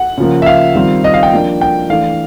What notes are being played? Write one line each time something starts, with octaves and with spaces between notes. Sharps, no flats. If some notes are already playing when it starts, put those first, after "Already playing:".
Already playing: F#5
C#3 F3 A#3
E5
F5
D#3 G3 C4 F4
D#5
F5
G5
F3 A#3 D4
G5
E3 A3 D4 F5